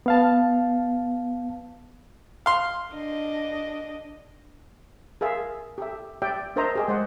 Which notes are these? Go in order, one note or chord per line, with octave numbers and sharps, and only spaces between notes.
B3 F5 A5
F5 C6
D4 D#5
G#4 A#4 E5 F5
G4 A4 E5
G4 D5 E5 G5
D4 A#4 C5 D#5 E5 A#5
G4 G#4 D#5
G#3 C5 D#5 F#5